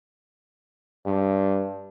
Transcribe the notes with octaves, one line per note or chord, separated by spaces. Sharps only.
G2